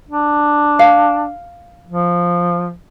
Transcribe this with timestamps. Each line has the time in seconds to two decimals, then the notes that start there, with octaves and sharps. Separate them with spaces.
0.10 D4
0.79 F5
1.87 F3